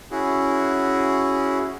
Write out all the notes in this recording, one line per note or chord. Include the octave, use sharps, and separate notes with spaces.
C#4 E4 F#4 G#4